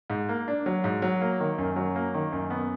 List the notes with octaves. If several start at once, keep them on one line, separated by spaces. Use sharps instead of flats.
G#2
A#3
D4
F#3
G#2
F#3
A#3
D#3
F#2
F#3
A#3
D#3
F#2
B3